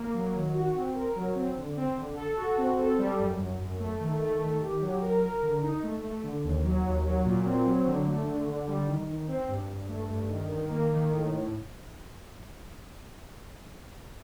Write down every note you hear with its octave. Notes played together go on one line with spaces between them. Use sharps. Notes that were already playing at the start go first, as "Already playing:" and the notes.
Already playing: A#3
F#3
D#3
F#4
C4
A#4
F#3
C4
D3
C4
D3
A4
F#4
C4
A4
G3
F#2
F#2
F#2
A3
D#3
A3
D#3
G4
F#3
A#4
A#4
D3
D#4
A3
A3
D3
D#2
F#3
D#2
F#3
A#2
C4
F#3
D3
A3
D3
D3
G3
D#3
D#3
C4
G2
G2
A3
G2
D#3
D#3
A#3
D#3
A2
A2